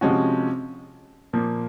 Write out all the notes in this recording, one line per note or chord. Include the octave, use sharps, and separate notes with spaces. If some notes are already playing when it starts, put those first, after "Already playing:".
C3 F3 G#3 C#4 F#4
A#2 F3 A#3